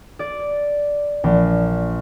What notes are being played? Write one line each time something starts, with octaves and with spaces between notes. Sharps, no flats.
D5
A#1